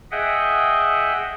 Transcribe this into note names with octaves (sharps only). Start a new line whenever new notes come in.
G#4 D#5 E5 F#5 G5